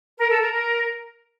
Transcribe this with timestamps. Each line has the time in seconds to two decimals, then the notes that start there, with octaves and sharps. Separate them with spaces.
0.18 A#4
0.29 A4
0.41 A#4
0.52 A#4